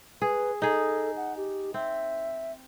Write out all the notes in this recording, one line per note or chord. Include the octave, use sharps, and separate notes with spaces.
G#4 B4
D#4 G#4 A4
F#5
G4
C4 E5